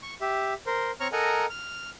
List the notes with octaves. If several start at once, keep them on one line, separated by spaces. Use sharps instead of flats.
C#6
G4 E5
A#4 C5
C4 C#5 A#5 C#6 F6
A4 A#4 D#5 F#5 G#5 A#5
F6